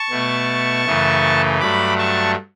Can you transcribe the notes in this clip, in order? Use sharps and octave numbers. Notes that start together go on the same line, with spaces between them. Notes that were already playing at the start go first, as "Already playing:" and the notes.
Already playing: A5 C#6
B2 A3
F#2 C#3 E3 A3
G2 F#3 A3 B5 D6
A5 C#6